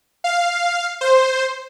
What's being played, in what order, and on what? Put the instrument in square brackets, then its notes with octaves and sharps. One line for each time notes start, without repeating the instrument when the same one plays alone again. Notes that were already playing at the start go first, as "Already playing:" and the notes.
[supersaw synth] F5
C5